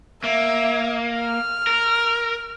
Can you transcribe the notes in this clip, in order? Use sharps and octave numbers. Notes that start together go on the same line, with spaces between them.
A#3 E5
F6
A#4